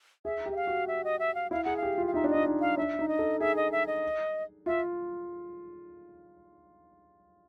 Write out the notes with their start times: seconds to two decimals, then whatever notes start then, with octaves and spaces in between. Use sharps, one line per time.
0.25 G#4 E5
0.46 G4
0.52 E5
0.56 F5
0.67 F#4
0.88 E5
1.04 D#5
1.19 E5
1.35 F5
1.51 E4 F5
1.64 G#4 F#5
1.77 F5
1.83 G4
1.98 F4
2.07 F5
2.14 D#4 E5
2.24 D4
2.30 D#4 D#5
2.46 D#4
2.61 F5
2.77 D4 E5
2.99 D#4
3.08 D#5
3.19 A4
3.40 G#4 E5
3.56 D#5
3.72 E5
3.87 D#5
4.66 F4 E5